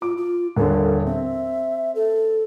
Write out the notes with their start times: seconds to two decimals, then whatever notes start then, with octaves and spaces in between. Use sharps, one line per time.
0.02 F4 D6
0.17 F4
0.56 D#1 D3 A#4
1.06 C4 E5
1.95 A4